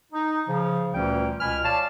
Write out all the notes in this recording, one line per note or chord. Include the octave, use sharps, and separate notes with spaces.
D#4
C#3 F3
D2 A#2 E3 G3 C#4 G5
C#2 B2 G#5 B5 F6
C#5 D5 F5 A5